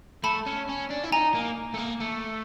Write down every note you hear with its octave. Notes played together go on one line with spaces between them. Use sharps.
A3 A5 B5
C#4
C#4
D4
E4
D#4 G#5 A#5
A#3
A3
A#3
A3